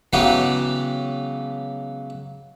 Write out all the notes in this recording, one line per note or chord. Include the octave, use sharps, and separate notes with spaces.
C#3 E3 F#3 G#3 B3 G4